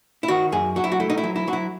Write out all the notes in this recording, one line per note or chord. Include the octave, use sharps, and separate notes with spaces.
E4
D#3 F#4
F#2 G#4
F#3 F#4
E4
F#4
A3 E4
D#4
E4
F#3
E4
F#3 F#4
E4